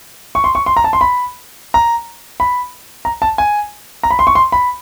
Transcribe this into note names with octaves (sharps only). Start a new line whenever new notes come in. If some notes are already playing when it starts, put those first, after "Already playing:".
C#6
C6
C#6
C6
A#5
A5
C6
B5
A#5
B5
A#5
A5
G#5
A#5
B5
C6
C#6
C6
B5